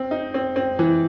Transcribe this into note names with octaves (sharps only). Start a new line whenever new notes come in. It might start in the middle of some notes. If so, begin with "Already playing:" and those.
Already playing: C4
D#4
C4
C4
E3